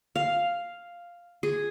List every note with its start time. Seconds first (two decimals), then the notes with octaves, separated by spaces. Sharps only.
0.15 F5
1.43 G#4